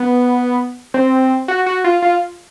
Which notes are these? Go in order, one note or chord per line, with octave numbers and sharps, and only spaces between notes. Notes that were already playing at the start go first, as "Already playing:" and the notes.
Already playing: B3
C4
F#4
F#4
F4
F4